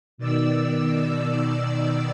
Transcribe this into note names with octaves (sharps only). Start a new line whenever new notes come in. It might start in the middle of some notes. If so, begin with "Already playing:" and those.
B2 D#3 D5 E6